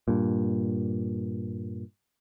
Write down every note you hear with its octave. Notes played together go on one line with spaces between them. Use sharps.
G2 A#2